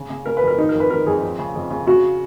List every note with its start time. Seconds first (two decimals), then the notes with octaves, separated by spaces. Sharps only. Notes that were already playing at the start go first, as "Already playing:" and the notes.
Already playing: C#3
0.10 C#3
0.26 C#3 A#4
0.37 B4
0.43 F2 A#4
0.58 D#3 D#4
0.69 F2 A#4
0.80 B4
0.90 D#3 A#4
1.06 F2 G#4
1.23 F2
1.39 C#3
1.55 F2
1.70 C#3
1.87 C#3 F#4